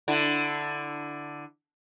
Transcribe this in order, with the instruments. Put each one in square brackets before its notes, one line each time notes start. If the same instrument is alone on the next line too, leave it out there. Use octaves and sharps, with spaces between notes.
[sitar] D3 E4